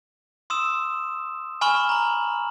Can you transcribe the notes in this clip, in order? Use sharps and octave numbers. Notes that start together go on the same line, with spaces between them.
C6 D#6 E6 E7
G#5 B5 C#6 F6 E7 F#7
A#5 F#7